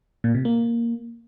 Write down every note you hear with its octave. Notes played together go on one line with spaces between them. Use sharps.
A#2
C3
A#3